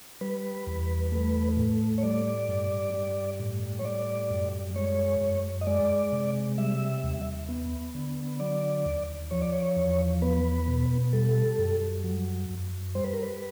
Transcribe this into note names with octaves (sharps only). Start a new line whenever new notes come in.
G3 B4
E2
A3
A2
C#5
G3 D5
G2
G3
A2
C#5
G3 D5
F#2
G#3 C#5
F#2
D#5
G#3 D5
C3
G3 E5
D#2
B3
D3
F#3 D5
D#2
F3 C#5
D5
C#5
E2
B3 B4
B2
G3 A4
F#2
F#3
F#2
G3 C5
B4
A#4
B4